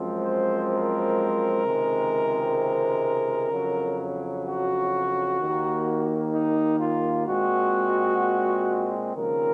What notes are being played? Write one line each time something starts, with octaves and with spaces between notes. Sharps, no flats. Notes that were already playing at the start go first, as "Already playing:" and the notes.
Already playing: F#2 F3 G#3 C4
C5
A#4
C#2 C3 D#3 G#3 C4
F2 C#3 F#3
F#4
D#2 D#3 A#3
D#4
F4
A#2 G#3 C4 F#4
D#2 C#3 F3 C4 A#4